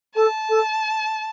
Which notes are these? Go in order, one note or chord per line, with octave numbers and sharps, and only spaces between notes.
A4 A5
A4